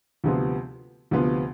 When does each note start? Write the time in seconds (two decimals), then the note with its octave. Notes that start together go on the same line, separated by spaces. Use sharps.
0.24 D2 C3 F3 B3 F4
1.11 D2 C3 F3 B3 F4